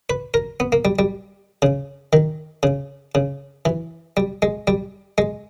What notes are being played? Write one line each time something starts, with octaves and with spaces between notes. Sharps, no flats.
B4
A#4
B3
A#3
G3
G3
C#3
D#3
C#3
C#3
E3
G3
G#3
G3
G#3